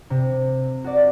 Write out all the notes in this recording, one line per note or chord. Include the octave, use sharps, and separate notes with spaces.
C3
F#4 D5